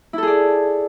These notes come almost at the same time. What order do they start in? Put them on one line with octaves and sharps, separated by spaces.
E4 A4 G#4 D5